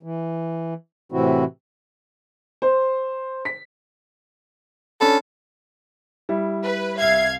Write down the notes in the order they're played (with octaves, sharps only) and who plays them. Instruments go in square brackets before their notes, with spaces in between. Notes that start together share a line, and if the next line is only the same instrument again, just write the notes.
[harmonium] E3
A2 C3 E3 C4 E4 F#4
[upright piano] C5
B6
[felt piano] C#4 D4 B5 [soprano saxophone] A4
[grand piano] G3 E4
[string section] B4
[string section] C2 F5 G#6 [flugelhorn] E5